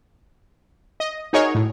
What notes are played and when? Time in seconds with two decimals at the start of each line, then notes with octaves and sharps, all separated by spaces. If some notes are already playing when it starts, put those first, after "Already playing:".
1.00 D#5
1.33 D#4 F#4 G#4 A#4 C#5 D#5
1.55 A2